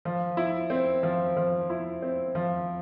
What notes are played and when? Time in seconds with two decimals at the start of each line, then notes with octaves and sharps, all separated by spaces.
0.05 F3
0.37 E4
0.70 C4
1.03 F3
1.37 F3
1.70 E4
2.02 C4
2.35 F3